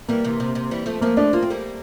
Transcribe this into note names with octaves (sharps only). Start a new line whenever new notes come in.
E3 G3 A#3
C3 E3
C3
C3
E3 G3
F3 A3
F3 A3 A#3
F3 A3 D4
A#3 F4
C4
G3 A#3